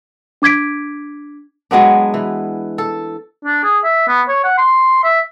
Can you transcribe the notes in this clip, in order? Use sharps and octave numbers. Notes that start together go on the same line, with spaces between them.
D4 D6 G#6 B6 D7
F#3 G#3 B3 D4
E3
A4
D4
G#4
E5
B3
C#5
F#5
C6
E5